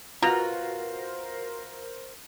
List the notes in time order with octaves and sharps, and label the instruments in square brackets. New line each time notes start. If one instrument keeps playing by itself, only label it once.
[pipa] B2 [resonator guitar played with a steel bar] F4 F#4 [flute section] A#4 C5 [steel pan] F5 A#5